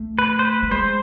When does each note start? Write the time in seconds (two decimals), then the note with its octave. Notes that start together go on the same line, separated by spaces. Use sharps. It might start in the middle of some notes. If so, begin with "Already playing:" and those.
Already playing: A3
0.19 B4
0.39 C5
0.45 B4
0.63 A3
0.71 G#3 C5